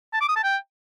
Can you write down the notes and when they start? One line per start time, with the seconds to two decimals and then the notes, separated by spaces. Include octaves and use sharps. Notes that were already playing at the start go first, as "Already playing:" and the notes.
0.13 A5
0.21 D6
0.28 D#6
0.36 A5
0.44 G5